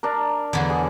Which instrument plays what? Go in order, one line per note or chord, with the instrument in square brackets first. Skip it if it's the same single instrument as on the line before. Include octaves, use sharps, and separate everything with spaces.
[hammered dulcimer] D4 A#4
[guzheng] E2 D3 F#3
[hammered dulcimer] G#4